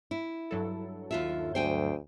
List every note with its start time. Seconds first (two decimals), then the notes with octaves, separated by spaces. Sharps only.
0.11 E4
0.51 G2 F#3 A4
1.11 D#2 F4 E5
1.55 D2 C5 G5 G#5